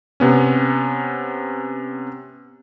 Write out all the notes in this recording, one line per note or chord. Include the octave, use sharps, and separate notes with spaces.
C3 B3 C#4